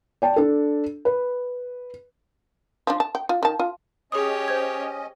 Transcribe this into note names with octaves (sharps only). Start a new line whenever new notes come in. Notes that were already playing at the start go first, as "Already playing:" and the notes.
D5 G5 A5
D4 A4
B4
F3 D4
A5
G5
F4
D#3 A5
F4
C#4 G4 G#4 C#5 D#5 D#6
C5 G6 G#6